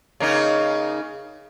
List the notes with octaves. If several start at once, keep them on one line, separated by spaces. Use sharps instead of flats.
C#3 A#3 D#4